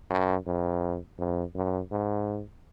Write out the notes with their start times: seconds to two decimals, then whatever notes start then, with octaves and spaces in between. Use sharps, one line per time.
0.10 F#2
0.46 F2
1.18 F2
1.55 F#2
1.91 G#2